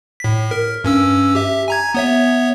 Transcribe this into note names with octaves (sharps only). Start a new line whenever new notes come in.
A2 B6
A#4
G2 C#4 E6
G4 E5
G#5 A#5 G#6
B3 C#5 E5